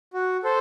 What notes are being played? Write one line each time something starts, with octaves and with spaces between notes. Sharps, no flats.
F#4
A4 C5